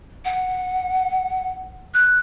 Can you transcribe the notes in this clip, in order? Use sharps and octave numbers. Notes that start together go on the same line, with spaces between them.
F#5
F#6